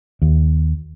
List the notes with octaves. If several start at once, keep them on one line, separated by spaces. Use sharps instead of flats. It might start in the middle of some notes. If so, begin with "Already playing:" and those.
D#2